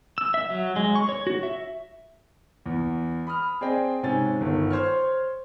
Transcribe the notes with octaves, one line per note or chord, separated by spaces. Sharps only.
E6
E5
F#3
G#3
C#6
C#5
F#4
E5
E2
B5 D#6 F6
C4 G#4 D5 D#5 G5
G#2 C3 C#4 G#5 A6
G1 D#3
C5 C#5 F6